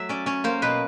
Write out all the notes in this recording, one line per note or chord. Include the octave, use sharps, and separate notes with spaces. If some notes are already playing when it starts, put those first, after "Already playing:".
Already playing: F#3 A3 E5
C#4 D5
C#4 C#5
A#3 C5
B2 B4